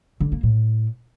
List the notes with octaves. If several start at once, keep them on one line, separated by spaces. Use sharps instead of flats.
D3
A#3
A2